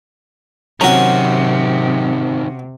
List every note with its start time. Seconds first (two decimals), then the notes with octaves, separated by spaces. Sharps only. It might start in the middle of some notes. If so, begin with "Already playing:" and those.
0.81 C3 D#3 F#3 C4 C#4 F#4 A#5